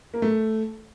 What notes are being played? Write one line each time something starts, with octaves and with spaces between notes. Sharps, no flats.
A#3
A3